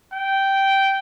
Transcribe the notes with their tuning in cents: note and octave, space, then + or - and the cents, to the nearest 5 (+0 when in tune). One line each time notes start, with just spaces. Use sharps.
G5 -10